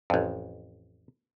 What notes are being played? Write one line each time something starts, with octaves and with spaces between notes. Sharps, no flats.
A1 F2